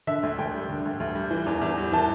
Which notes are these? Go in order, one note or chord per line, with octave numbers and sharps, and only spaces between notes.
D3 E5
D2
D2 G5
G3
D3
D2
D2
G3
E3
E2
E2
G3
E3 A5